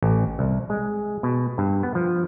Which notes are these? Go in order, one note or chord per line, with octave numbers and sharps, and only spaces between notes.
A1
C2
G#3
B2
G2
B3
F3